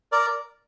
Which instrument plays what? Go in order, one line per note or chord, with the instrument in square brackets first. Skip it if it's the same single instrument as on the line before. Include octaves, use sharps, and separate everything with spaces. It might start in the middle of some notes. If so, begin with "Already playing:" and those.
[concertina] A#4 D5